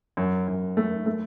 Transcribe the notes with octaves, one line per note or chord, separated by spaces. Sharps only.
F#2
F#2
A3
A3